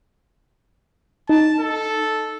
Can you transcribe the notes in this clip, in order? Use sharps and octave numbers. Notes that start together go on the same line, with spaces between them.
D#4 A5
A4